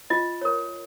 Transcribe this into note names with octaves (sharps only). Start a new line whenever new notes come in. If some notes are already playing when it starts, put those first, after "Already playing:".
F4 D#5
A#4 C#5